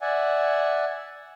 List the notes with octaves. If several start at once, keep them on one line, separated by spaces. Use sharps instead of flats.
D5 E5 F#5 G#5